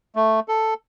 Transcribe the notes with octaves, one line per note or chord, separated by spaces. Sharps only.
A3
A4